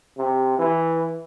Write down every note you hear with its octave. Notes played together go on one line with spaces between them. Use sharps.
C3
E3